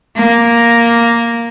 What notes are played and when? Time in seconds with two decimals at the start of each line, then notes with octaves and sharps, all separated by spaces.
0.16 A#3